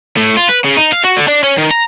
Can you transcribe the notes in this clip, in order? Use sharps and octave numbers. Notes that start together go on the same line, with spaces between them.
A2
F4
B4
C#3
D#4
F5
F#4
D3
D4
C#4
D#3
A#5